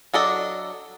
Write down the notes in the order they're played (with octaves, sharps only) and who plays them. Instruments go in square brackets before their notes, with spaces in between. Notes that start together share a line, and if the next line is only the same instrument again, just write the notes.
[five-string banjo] F#3 D4 A4 D#5